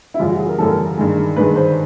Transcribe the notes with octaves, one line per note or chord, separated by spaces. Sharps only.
E4
F#2 C#3 E3 G3 F4
F#4
G#4
A#4
F#2 C#3 E3 G3 A4
A#4
G2 D#3 G#3
G2 D#3 G#3 B4
C5